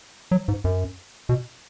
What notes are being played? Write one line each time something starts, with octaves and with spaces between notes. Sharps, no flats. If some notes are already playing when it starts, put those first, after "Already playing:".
F#3
G#2
F#2
B2